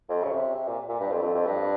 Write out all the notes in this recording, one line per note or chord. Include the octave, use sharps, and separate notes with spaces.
F2
C#3
C3
C3
A#2
A#2
G2
F2
F2
F2
G2